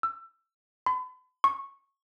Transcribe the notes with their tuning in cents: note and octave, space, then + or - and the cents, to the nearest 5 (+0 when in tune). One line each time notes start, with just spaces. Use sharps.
E6 +25
B5 +40
C#6 -15